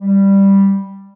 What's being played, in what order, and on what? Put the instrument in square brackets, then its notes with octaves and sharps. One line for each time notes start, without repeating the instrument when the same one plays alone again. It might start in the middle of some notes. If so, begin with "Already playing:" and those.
[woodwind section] G3